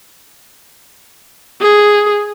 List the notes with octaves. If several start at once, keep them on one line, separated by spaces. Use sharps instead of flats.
G#4